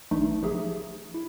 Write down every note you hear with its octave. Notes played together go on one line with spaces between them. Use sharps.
A1 E3 A3 D4 D#4
F3 D#4 G4 G#4 E5
E4